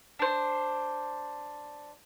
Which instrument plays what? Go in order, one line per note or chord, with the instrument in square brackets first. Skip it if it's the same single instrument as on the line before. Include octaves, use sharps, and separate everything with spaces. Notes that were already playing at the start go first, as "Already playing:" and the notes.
[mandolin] D4 C5